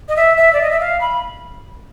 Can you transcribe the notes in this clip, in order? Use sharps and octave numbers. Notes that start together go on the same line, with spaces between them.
D#5
E5
E5
D5
D#5
E5
F5
B5